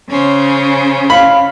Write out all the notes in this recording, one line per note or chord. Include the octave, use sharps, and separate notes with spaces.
C#3 C#4 C5
F5 B5